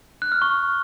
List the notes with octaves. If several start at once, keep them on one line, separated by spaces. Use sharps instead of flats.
F#6
F6
C#6